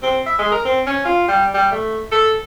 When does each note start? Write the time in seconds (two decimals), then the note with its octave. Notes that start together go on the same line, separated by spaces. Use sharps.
0.03 C4
0.26 E5
0.39 G#3
0.52 A#4
0.65 C4
0.87 C#4
1.05 F4
1.28 G3
1.54 G3
1.71 A3
2.12 A4